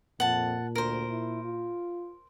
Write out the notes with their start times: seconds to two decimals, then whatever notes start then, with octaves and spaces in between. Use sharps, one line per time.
0.20 F2 A#2 F#5 A5
0.75 D2 A#4 C5
1.09 E4
1.45 F4